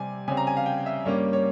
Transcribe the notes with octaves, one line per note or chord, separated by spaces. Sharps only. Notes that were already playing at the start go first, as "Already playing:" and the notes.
Already playing: C3 G3 C4 G#5
C#3 G3 C4 G#5
A#5
G#5
F5
G5
E5
G2 G3 A#3 C#4 C#5
C#5